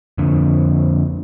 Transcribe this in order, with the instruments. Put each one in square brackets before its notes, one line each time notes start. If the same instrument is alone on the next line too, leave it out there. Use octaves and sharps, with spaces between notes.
[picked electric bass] F2 D3